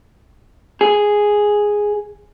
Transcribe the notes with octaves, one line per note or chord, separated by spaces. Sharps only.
G#4